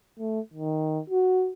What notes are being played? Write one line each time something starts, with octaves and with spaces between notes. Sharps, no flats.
A3
D#3
F#4